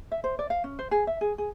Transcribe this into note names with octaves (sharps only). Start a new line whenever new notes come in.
E5
C5
D5
F5
C#4
C5
G#4
E5
G#4
G#4